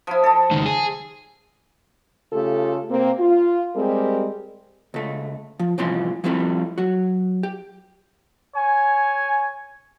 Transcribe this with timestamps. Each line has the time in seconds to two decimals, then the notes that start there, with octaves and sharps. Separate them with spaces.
0.07 F3 E4
0.24 A4 D#5
0.51 C#2 D#3
0.66 G#4
2.33 C#3 A3 F4 G4 A4
2.90 C3 A#3 C4
3.20 F4
3.75 G3 G#3 C4 G4 G#4 A#4
4.94 C#2 A3
5.59 F3
5.78 C2 A2 E3 F3 C#4 C6
6.24 F3 G3 A3 C4 E4
6.78 F#3 F#4
7.43 G4
8.55 C#5 G#5